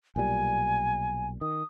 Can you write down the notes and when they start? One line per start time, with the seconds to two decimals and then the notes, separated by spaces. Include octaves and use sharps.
0.16 B1 A#2 G3 G#5
1.41 D#3 D#6